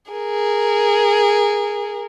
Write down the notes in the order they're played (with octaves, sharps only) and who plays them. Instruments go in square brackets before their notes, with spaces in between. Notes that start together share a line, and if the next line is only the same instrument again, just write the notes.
[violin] G#4 A#4